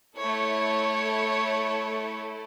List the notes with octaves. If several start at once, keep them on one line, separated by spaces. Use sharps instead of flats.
A3 E4 A4 C#5